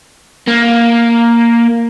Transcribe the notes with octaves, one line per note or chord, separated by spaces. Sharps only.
A#3